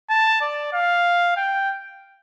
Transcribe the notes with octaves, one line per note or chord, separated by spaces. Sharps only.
A5
D5
F5
G5